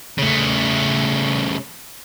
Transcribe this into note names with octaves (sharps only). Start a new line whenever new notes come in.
C#3 A3